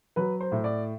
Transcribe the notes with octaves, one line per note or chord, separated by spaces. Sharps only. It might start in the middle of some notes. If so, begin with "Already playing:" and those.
F#3 B4
C5
A2
D5